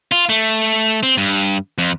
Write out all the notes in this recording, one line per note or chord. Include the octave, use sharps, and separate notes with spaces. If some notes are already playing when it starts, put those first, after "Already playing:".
F4
A3
C4
G2
F2